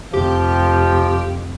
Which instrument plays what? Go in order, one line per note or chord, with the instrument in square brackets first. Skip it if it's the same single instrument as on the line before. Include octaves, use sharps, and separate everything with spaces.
[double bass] F1 F2 [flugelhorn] F3 [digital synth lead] G4